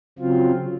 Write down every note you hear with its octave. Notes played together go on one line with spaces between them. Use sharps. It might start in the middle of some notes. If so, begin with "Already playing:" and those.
C#3 F#3 C4 F4